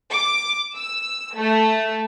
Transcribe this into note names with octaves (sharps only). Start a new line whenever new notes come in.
D6
E6
A3